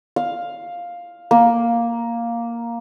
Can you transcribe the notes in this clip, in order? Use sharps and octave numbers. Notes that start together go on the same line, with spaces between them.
F5
A#3